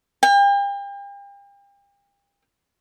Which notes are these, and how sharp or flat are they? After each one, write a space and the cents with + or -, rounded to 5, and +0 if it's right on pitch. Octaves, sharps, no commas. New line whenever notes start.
G5 +40